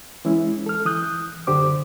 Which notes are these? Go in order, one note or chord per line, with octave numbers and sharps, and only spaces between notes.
E3 G#3 C#4 E4
A4 F6
E3 D#6 F#6 G6
C#2 F#2 D3 G4 C5 D6